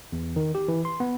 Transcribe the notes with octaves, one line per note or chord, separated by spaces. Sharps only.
E2
D#3
G4
E3
C6
B3